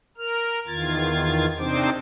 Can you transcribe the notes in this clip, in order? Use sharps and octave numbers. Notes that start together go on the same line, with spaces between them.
A#4 F6
E2 D#3 F4 G#6 A6
C3 C4 D4 D#4 C5 D6